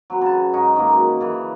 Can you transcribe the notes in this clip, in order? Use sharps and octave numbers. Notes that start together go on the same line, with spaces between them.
F#3 C4 B4
C#3 A5
G#2 D#4 G#4 C#6
G#2 D#3 G#3 A#3
F#2
C#3 E3